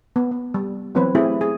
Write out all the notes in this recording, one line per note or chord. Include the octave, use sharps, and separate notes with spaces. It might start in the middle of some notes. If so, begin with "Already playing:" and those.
B3
B3
G3
E3 F#3 B3 C4 B4 C#5
A3 C4 E4 G4 G#4
G#4